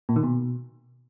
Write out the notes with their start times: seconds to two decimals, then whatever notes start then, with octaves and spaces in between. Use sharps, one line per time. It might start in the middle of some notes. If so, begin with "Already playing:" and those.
0.09 A#2
0.16 D#3
0.23 B2